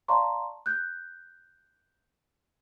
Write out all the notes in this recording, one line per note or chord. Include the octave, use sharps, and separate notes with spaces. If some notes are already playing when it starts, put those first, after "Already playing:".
D5 F5 A5 A#5 C6 C#6
F#6 G6